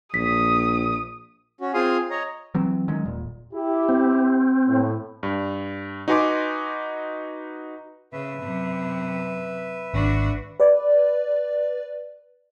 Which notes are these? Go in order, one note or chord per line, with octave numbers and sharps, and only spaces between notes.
A#1 D#6 B6
C#4 F#4
C4 F4 G#4 F5 C6 D#6
C#5 D#5 A#5
E3 F#3 C4
D#3 F#3 G#3 C#4
D#1 A#2
E4 G4
C4
A2
G2
D#4 F#4 B4 G#5 C6 D6
C#3 B4 E5
F#2 C3
G#1 D4 F#4
B4 D5